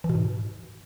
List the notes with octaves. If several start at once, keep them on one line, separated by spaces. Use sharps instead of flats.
E3
B2
G#2